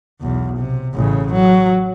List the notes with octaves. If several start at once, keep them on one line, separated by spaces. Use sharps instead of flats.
B1 E2
C3
A1 C#3
F#3